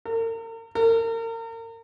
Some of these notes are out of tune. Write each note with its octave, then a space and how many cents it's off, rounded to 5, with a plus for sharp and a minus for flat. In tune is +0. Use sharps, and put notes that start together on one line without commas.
A#4 -40
A#4 -35